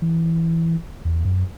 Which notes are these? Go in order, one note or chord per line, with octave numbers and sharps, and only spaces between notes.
E3
E2
F#2